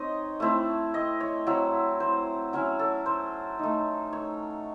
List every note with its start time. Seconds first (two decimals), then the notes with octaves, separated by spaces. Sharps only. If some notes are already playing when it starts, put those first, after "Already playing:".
Already playing: C4 D#4 C#5 D#5
0.40 A3 C4 E4
0.94 D#5
1.20 C#5
1.47 F#3 C4 E4
2.00 C5
2.53 F#3 C#4 E4
2.79 A4
3.06 C5
3.59 A3 D#4
4.13 C#5